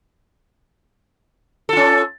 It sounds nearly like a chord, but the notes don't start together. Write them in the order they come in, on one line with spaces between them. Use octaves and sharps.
A4 F4 C#4